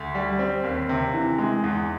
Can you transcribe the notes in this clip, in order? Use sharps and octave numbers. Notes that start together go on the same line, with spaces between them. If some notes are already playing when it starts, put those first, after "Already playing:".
Already playing: D2
G3
C4
D#2
C3
E3
G#3
E2